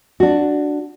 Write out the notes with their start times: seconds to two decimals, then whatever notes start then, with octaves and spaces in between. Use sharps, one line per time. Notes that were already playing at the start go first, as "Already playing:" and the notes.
0.20 D4 F#4